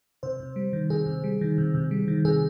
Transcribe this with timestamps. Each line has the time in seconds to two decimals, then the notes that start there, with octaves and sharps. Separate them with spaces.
0.23 C3 C5
0.40 C3
0.56 G3
0.73 D#3
0.90 C3 G#4
1.06 C3
1.24 G3
1.41 D#3
1.58 C3
1.74 C3
1.91 G3
2.08 D#3
2.25 C3 G#4